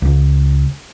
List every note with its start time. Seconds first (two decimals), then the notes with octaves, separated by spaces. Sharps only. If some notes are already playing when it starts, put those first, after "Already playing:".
0.02 C#2